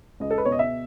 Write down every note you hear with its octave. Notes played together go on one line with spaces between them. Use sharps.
C#2 D#5
A4
B4
B2 C#5
D#5
E5